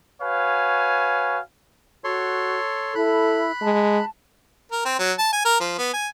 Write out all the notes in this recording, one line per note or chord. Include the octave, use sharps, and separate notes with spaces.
F#4 B4 C#5 F5 G#5
F#4 A4 C#5 C6
E4 A4 B5 F#6
G#3 A5
A#4
C4
F#3
A5
G#5
A#4
F3
B3
G#5